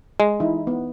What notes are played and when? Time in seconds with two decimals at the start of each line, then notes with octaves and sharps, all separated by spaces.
0.20 G#3
0.40 E3 D#4 E4
0.67 B3